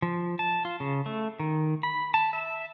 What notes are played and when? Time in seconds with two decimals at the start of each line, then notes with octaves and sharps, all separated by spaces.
0.02 F3
0.39 A5
0.65 F4
0.80 C#3
1.06 A3
1.39 D#3
1.83 B5
2.14 A5
2.33 E5